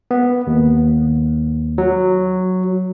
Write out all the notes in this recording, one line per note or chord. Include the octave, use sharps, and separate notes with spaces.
B3
D#2
F#3